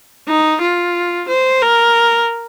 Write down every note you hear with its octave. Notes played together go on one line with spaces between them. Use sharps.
D#4
F4
C5
A#4